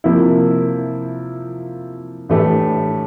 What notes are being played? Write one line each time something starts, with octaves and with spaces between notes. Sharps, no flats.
C3 F3 A#3 E4
A2 E3 A3 D4 G4